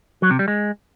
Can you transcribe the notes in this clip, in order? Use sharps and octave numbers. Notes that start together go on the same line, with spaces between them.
F#3
C3
G3
G#3